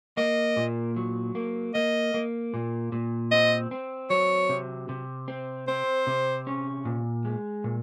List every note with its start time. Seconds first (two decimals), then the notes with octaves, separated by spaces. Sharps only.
0.17 A#3 D#5
0.57 A#2
0.96 F#3
1.35 A#3
1.74 A#3 D#5
2.14 A#3
2.54 A#2
2.92 A#2
3.31 C4 D#5
3.71 C4
4.10 F#3 C#5
4.49 C3
4.89 C3
5.28 C4
5.68 C4 C5
6.07 C3
6.47 C#4
6.85 A#2
7.25 G#3
7.64 A#2